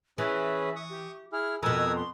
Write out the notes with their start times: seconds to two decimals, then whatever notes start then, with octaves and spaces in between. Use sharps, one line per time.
0.18 E3 C#4 G#4 B4 E5
0.76 C#6 D#6
0.90 G4
1.32 E4 G#4 F6
1.63 F2 B2 A#4 G#5 D#6 E6
1.96 C6